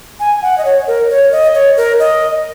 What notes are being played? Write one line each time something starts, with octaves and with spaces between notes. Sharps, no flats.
G#5
F#5
D#5
C#5
A#4
C#5
D#5
C#5
A#4
D#5